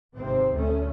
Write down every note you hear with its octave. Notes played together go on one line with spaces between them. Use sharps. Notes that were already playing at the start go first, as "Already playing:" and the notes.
G#1 C3 C4
D2 A3 C#4